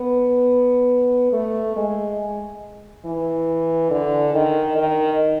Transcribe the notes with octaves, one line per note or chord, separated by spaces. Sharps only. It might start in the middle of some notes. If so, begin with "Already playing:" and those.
Already playing: B3
A3
G#3
E3
D3
D#3
D#3